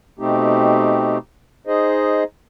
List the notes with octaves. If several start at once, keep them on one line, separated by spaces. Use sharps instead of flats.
B2 A3 C4 D#4 G4
D#4 G#4 C5 D#5